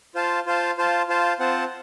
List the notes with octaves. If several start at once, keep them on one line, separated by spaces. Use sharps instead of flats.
F4 C5 F5 A5
F4 C5 F5 A5
F4 C5 F5 A5
F4 C5 F5 A5
C4 F4 C5 F#5 A5